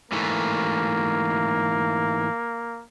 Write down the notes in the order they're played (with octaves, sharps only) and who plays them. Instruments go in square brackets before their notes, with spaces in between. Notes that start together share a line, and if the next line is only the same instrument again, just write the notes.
[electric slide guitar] G#2 E3 A3 [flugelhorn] A#3